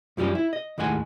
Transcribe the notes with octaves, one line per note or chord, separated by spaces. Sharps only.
F#2 F3 G3 C#4 G4
E4
D#5
D#2 A2 G#3 F#5 G#5